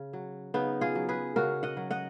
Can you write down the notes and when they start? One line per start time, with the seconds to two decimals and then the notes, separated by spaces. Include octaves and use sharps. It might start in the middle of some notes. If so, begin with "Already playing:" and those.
Already playing: C#3
0.13 F#3
0.54 C#3 B3 D#4
0.81 F4 G#4
0.95 F#3
1.09 G#4 B4
1.36 C#3 F#4 A#4
1.63 D#5 F#5
1.77 F#3
1.91 D#5 F#5